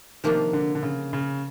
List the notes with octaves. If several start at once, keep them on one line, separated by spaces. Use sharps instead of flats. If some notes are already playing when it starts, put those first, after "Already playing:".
C3 D#3 F3 A#3 D4
D3
D3
C#3
C#3